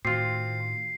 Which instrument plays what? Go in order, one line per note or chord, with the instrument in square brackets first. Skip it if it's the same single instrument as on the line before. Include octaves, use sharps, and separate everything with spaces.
[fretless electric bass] A2 D#3 [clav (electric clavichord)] C4 F4 [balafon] F#4 [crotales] C7